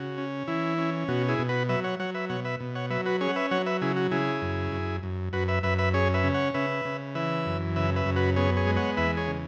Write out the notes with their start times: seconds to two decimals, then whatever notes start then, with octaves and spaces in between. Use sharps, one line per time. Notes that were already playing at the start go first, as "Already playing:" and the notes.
Already playing: C#3 F#4
0.18 C#4
0.48 E3 E4
0.78 C#4
1.08 B2 F#4
1.29 E4 G#4
1.39 B2
1.49 F#4 B4
1.69 F#3 B4 E5
1.84 C#5 F#5
2.00 F#3 C#5 F#5
2.15 B4 E5
2.29 B2 C#5 F#5
2.45 B4 E5
2.60 B2
2.75 C#5 F#5
2.90 F#3 B4 E5
3.06 F#4 B4
3.21 C#4 G#4 C#5
3.29 F#5
3.36 B4 E5
3.51 F#3 C#5 F#5
3.66 B4 E5
3.82 C#3 E4 G#4
3.96 F#4
4.11 C#3 E4 G#4
4.42 F#2
4.72 F#2
5.03 F#2
5.33 F#2 F#4 B4
5.48 B4 E5
5.63 F#2 B4 E5
5.79 B4 E5
5.94 C#4 G#4 C#5
6.14 B4 E5
6.24 C#3
6.34 C#5 F#5
6.54 C#3 B4 E5
6.85 C#3
7.15 E3 B4 E5
7.46 F#2
7.76 C#3 B4 E5
7.96 B4 E5
8.06 F#2
8.16 F#4 B4
8.36 B3 G#4 C#5
8.57 G#4 C#5
8.67 G#3
8.76 C#5 F#5
8.97 E2 B4 E5
9.17 G#4 C#5
9.28 C#3